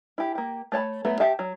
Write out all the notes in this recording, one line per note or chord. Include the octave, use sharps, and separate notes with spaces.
E4 G4
A#3 G4
A3 C#5 A5 B5
F#3 A3 B3 F#4
G4 E5 A5
F#3